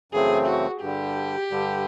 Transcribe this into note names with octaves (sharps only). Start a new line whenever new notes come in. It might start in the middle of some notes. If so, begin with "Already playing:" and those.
F#2 C#3 E3 A3 C4 G#4
F#4
G2 D3 G3 G4
G2 D3 G3